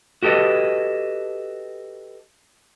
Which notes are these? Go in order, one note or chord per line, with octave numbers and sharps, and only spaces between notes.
F#4 G4 A4 B4 D#5